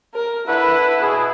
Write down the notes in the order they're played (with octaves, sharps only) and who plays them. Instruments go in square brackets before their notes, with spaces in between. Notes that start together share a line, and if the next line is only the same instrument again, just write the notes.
[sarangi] A#4
[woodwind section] D4 A4 F#5 [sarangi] E4 [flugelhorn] B4
[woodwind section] B2 [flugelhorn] G#4